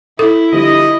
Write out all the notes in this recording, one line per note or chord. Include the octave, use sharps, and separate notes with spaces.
E4 A4
D3 F3 G3 D#5